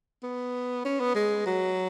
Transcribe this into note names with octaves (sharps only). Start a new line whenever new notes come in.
B3
C#4
B3
G#3
F#3